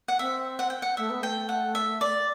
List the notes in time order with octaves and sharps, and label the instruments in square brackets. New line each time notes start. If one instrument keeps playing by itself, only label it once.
[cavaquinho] F#5
[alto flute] C4 [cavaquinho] E5
[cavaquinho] F#5
G5
F#5
[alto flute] A3 [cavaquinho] E5
[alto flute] B3
[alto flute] A3 [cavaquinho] G5
[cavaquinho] F#5
E5
D5